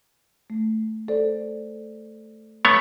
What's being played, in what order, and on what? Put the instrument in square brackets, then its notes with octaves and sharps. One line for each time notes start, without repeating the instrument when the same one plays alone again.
[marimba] A3
A4 C5 D5
[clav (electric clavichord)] A3 B3 C#5